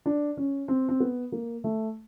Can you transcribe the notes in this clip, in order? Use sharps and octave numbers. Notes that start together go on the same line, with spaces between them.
D4
C#4
C4
C4
B3
A#3
A3